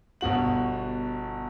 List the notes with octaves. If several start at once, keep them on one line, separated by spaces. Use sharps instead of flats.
G1 B2 F#4 F#7